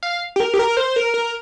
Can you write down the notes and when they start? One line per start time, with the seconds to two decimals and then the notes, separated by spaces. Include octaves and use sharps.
0.03 F5
0.36 G4
0.40 A#4
0.54 G4
0.59 A#4
0.77 C5
0.96 A#4
1.14 A#4